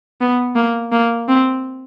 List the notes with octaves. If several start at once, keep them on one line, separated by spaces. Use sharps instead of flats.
B3
A#3
A#3
C4